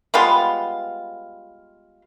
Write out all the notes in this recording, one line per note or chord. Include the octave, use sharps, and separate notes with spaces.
G3 G#3 B3 F4